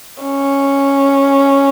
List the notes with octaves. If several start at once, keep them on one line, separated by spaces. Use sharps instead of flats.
C#4